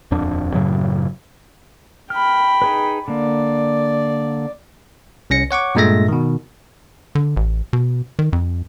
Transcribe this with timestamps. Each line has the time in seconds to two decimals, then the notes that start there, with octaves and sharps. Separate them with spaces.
0.11 D#1 F2 D4
0.54 F#2 A2 C#3 F#3
2.10 G5 B5 F6
2.62 D#4 G#4 B4
3.08 D3 A#3 D5
5.30 C2 C#4 A#6 C#7
5.51 C#5 F#5 C#6 D6
5.75 G2 A#2 G#3 A3 E5 A#6
6.08 B2 D#3
7.15 D3
7.36 A1
7.73 B2
8.19 D#3
8.33 F2